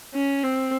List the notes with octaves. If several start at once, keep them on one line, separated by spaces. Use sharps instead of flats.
C#4
C4